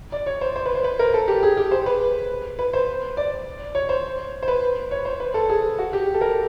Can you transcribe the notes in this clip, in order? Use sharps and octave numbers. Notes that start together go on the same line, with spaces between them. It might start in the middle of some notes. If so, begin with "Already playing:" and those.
D5
C#5
C5
C5
B4
C5
B4
A#4
A4
G4
G#4
G4
C5
B4
B4
C5
D5
C#5
C5
C5
B4
C#5
C5
B4
A4
G#4
F#4
G4
A4
A#4